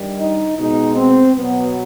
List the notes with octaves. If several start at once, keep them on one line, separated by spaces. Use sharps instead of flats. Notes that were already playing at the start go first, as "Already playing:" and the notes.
Already playing: G2 D#3 G3
D#4
B2 G#3 D#4
C4
B2 F#3 B3